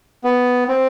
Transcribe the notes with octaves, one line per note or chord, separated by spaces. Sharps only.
B3
C4